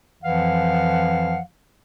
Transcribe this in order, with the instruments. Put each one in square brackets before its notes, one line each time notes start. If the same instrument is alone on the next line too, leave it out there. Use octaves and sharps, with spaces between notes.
[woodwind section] F2 E3 F3 F5 F#5